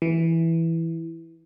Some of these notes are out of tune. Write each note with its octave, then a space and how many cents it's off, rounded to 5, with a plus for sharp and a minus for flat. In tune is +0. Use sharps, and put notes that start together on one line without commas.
E3 +0